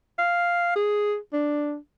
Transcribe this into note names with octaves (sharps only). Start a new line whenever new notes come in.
F5
G#4
D4